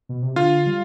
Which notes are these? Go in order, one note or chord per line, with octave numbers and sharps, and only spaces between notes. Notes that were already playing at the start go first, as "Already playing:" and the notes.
B2
C3
D3 F4 F5
G3